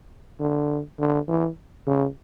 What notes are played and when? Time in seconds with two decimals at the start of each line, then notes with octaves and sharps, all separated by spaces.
0.40 D3
0.99 D3
1.28 E3
1.87 C#3